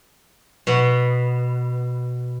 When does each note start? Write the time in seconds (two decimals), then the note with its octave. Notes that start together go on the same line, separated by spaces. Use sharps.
0.67 B2 B3